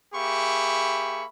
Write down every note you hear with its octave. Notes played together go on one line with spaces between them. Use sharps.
A#3 G4 G#4 E5 B5 C#6